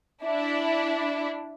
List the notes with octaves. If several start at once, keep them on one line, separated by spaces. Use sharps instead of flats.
D4 E4